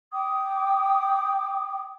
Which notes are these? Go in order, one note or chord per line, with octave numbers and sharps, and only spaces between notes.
G5 D6 D#6